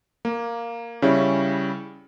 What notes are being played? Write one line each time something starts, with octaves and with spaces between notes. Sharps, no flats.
A#3
C#3 G3 C#4 E4